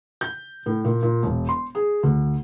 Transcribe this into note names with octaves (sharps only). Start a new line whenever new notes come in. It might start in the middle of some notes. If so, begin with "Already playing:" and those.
G6
A2
A#2
A#2
E1
C6
G#4
D2